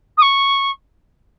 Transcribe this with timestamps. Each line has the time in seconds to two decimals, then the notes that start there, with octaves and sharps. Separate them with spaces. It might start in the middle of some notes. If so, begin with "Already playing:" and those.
0.18 D#6
0.22 C#6